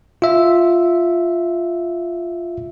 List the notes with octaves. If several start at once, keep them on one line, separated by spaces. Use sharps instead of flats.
F4 E5